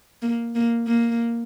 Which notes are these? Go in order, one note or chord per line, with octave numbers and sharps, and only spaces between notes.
A#3
A#3
A#3